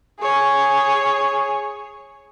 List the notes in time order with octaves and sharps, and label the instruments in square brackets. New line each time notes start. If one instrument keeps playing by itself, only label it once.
[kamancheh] G#4 C#5